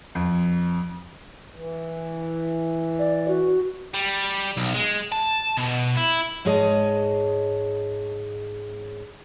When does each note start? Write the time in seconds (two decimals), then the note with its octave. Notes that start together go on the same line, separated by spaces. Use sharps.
0.15 F2
1.55 E3
2.99 D5
3.28 F#4
3.94 G3
4.57 B1
4.74 G#3
5.12 A5
5.57 B2
5.97 E4
6.45 G#2 G#3 G#4 C#5 D#5 A5